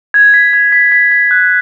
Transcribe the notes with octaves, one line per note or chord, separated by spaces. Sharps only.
G#6
B6
G#6
B6
B6
B6
F#6